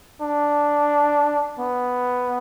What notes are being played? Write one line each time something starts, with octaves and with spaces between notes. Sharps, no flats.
D4
B3